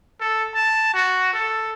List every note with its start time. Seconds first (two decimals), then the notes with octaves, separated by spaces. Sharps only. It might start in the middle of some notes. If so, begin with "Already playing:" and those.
0.20 A4
0.55 A5
0.94 F#4
1.33 A4